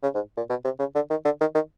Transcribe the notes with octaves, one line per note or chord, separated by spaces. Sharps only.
C#3
G#2
A#2
B2
C3
C#3
D3
D#3
D3
D#3
D#3